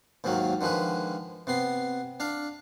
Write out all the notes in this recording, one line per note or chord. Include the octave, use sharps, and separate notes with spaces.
D#2 G#2 D#3 F#3 A#3
D3 D#3 F3 G#3 B4
C3 B3 C6
D4 F5